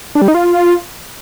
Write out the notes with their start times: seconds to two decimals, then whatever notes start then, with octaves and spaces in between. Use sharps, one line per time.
0.15 D4
0.22 G3
0.28 D#4
0.34 F4